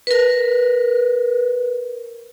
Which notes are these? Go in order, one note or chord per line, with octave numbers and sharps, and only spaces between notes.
A#4 B4